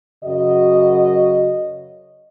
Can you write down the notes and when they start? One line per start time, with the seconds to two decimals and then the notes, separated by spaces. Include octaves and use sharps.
0.24 F#2 C#3 F#4 D#5